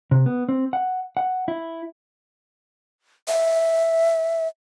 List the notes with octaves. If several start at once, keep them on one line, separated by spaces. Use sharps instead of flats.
C3
B3
C4
F#5
F#5
E4
E5